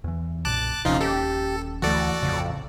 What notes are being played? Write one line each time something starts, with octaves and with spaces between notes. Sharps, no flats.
E2 E3
B1 F#2 A#2 A5 D6 F#6
D#1 D#2 C3 F3 C#4 D#4 F4
G4 A4
D2 E3 A3 F#4 A4 D5
A1 F2 C#3